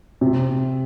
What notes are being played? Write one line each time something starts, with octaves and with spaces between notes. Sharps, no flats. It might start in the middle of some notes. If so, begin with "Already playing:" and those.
C3